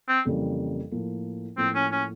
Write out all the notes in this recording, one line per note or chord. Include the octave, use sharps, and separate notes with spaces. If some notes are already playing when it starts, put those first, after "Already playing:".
C4
F2 C#3 E3 G3 A#3
A2 F3 A#3
A2 F3 A#3 C4
C#4
C#4